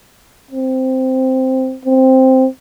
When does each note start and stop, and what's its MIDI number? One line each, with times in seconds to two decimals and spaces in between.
0.51 1.76 60
1.85 2.47 60